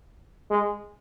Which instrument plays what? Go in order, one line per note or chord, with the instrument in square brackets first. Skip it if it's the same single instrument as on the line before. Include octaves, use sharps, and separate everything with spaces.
[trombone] G#3